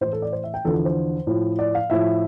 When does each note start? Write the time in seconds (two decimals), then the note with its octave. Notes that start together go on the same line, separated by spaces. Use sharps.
0.01 A2 E3 C5
0.13 A4
0.22 D5
0.32 C5
0.44 E5
0.54 G5
0.65 E2 D3 F3 A4
0.75 A4
0.85 C5
1.27 A2 F3
1.59 D5
1.75 F5
1.90 A2 F3 E5